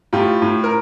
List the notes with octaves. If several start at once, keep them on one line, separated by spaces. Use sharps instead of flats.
A2 F4 G4
A2
A#4